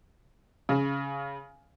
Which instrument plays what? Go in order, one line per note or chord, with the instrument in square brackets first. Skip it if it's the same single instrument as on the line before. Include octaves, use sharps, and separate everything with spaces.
[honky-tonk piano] C#3